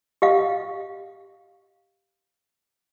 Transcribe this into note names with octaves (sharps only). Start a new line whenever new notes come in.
G4 D#5 F5